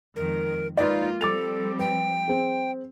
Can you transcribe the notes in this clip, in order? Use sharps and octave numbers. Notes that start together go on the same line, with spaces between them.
F2 D#3 G#3 A#4
G#3 A#3 D#4 F4 B4 D5
F3 G3 C4 A4 D6 A6 F7
B4 G5
C4 G#4